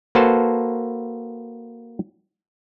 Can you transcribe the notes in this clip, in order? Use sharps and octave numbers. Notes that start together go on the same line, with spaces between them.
A#3 F#4 A4 B4 C5 A5